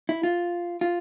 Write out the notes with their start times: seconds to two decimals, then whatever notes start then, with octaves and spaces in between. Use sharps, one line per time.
0.09 E4
0.23 F4
0.81 F4